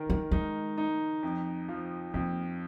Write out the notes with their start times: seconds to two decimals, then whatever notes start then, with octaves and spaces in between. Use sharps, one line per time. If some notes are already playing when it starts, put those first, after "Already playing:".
Already playing: D#3 A#4
0.10 G#3
0.32 G#3 D#4
0.78 D#4
1.23 F2
1.69 F3
2.14 F2 A#3